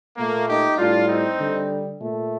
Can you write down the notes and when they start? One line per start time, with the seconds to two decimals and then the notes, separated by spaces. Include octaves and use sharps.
0.17 A#2 A3 A#3
0.47 D#4 G4
0.77 A2 G3 D4 F4
1.08 C4 D#4
1.39 D3 G3
2.00 A#2 A3